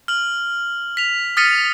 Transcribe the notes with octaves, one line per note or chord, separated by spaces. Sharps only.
F6 F#7
B6 F7
D#6 F6 A6 B6 C#7 D#7